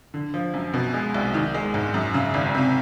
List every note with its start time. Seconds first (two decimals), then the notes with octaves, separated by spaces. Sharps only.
0.14 D3
0.34 F3
0.54 F#2
0.74 B2
0.94 G#3
1.14 C2
1.34 D#3
1.54 G#3
1.74 G#2
1.94 F#2
2.14 C#3
2.34 G#1
2.55 C3